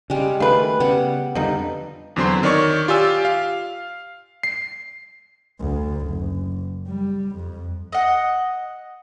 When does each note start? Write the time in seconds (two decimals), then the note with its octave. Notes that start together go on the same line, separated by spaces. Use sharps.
0.10 C#3 G3 G#3
0.40 D#3 A3 F4 B4
0.80 C#3 G3 B3 F#5
1.35 F2 D3 F3 G3 D#4
2.16 E2 D3 F#3 C4 C5 C6
2.43 D#3 C#5 D5 C#6
2.88 F4 G4 D5 G#5 E6
3.25 F5
4.43 C7
5.61 D2
6.08 F#1
6.87 G3
7.36 F2
7.93 D#5 F#5